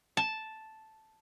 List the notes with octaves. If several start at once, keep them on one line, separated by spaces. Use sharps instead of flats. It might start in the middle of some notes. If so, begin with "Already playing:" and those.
A5